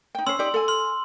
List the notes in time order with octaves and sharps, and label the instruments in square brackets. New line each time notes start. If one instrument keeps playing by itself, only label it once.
[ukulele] D#4 G5
[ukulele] C#4 C5 [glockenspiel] C6 E6 F#7
[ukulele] D#4 G4 D5
A4 G#5
[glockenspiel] C6 F6